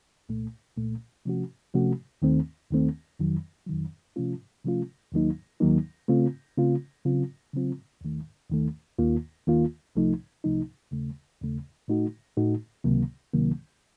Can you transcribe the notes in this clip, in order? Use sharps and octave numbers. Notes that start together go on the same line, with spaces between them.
C2 A#2 A3
C2 A#2 A3
C3 F3 A3 C#4 F#4
C3 F3 A3 C#4 F#4
D#2 D#3 A3 C4
D#2 D#3 A3 C4
F2 D#3 F#3
F2 D#3 F#3
C3 F3 A3 C#4 F4
C3 F3 A3 C#4 F4
D#2 D#3 F#3 A#3 D#4
D#2 D#3 F#3 A#3 D#4
C#3 A3 C4 F4
C#3 A3 C4 F4
C#3 F#3 C4 F4
C#3 F#3 C4 F4
D#2 D#3 A3
D#2 D#3 A3
D#2 D#3 A#3 F4
D#2 D#3 A#3 F4
C2 C3 F3 A3 D#4
C2 C3 F3 A3 D#4
D#2 C#3 A3
D#2 C#3 A3
A2 A3 D#4 F#4
A2 A3 D#4 F#4
C#2 C3 D#3 F#3 A#3
C#2 C3 D#3 F#3 A#3